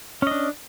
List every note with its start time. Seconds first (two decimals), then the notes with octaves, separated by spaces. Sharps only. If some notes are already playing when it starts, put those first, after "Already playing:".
0.22 C#4
0.27 D#5
0.31 D4